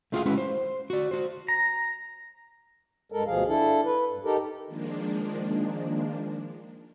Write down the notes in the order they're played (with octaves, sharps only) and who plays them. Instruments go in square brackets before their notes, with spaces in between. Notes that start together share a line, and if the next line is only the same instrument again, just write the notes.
[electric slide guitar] A3 D4 F4 G4 G#4 F5
G#3 C#4 E4 F#4 B4
C5
F#4 D5
F#4 C5
[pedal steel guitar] A#5
[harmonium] G2 G#3 A4 A#4
D2 B2 F3 G#4 F5
D4 E4 A4
B4
G2
D#4 G4 A4 A#4
[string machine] D#3 F3 G#3 A#3 D4